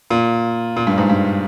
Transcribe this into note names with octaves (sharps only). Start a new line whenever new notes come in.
A#2
A#2
G2
G#2
G2